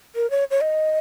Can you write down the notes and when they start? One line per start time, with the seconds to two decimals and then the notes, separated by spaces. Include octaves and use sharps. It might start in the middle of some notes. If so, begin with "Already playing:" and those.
0.16 A#4
0.30 C#5
0.51 C#5
0.61 D#5